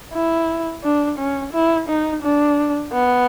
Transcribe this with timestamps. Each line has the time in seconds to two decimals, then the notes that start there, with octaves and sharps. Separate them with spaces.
0.14 E4
0.84 D4
1.18 C#4
1.53 E4
1.89 D#4
2.23 D4
2.93 B3